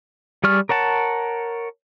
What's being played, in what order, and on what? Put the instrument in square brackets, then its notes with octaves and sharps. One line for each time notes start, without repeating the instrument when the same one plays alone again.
[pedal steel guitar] G3 G#4 D5 C#6 F6
A#4 C#5 F#5 A5